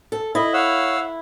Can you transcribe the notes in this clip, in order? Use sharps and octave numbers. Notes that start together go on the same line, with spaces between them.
A4
E4 D#5
C#5 F5 F#5 E6